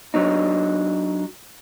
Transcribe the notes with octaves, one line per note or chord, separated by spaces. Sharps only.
F#3 D4 D#4